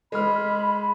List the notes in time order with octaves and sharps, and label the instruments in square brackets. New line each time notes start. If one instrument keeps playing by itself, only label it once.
[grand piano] G#3 F6 [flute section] B5